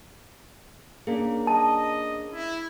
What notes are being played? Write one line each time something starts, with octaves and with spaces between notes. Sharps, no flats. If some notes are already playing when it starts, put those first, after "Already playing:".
A#3 C#4 D4 G#4
D#5 A5
E4